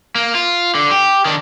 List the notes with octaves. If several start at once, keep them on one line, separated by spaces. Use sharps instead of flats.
A#3
F4
D3
G4
D#3 D4